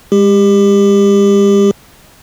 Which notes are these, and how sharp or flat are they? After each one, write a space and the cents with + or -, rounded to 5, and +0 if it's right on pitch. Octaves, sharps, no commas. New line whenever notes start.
G#3 -40 G4 +25